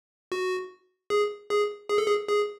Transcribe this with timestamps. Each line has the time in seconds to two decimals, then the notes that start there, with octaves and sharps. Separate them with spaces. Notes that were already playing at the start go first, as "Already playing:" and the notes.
0.32 F#4
1.10 G#4
1.50 G#4
1.89 G#4
1.98 A4
2.07 G#4
2.29 G#4